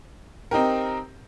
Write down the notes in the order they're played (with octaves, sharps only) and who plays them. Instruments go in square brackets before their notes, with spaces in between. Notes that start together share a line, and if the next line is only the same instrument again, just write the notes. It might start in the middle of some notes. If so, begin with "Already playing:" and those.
[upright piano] C4 D#4 G4 A#4